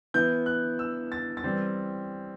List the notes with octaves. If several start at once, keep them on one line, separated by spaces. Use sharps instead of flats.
E3 B3 E4 G6
F#6
E6
A6
A6
E3 G3 C4